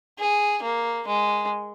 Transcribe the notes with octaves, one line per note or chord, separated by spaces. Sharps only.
G#4
A#3
G#3